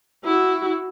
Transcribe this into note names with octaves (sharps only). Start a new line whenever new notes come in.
E4 F#4